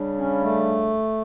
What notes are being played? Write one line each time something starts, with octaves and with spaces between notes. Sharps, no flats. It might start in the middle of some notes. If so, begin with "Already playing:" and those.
Already playing: C#3 G3 D4
C#4
A3